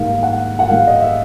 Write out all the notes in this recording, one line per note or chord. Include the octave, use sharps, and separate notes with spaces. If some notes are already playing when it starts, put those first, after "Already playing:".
Already playing: G#2 D#3 G3 A#3 F5
F#5
F#5
G#2 D#3 G3 A#3 F5
D#5
E5